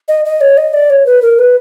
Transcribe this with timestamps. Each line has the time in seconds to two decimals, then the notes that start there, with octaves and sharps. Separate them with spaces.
0.08 D#5
0.25 D#5
0.41 C#5
0.57 D#5
0.74 D5
0.90 C#5
1.06 B4
1.22 A#4
1.39 B4